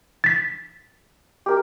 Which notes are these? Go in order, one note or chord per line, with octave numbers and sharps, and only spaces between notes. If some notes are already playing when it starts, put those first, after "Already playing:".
A6 B6
G4 A#4